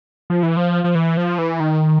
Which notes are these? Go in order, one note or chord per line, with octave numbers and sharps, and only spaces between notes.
F3
E3
F3
F3
E3
F3
E3
D#3